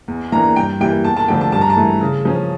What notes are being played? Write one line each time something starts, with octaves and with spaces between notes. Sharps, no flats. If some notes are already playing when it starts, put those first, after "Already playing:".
E2
E3 A#3 D4 A#5
G2 G5
E3 G3 A#3 G5
E2 A5
A5
D3 F3 A3 D4 G5
A5
G2 A5
A#5
A5
E3 A3
C#3
F3 C#4